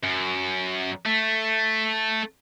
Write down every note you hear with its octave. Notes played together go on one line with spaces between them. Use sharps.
F#2
A3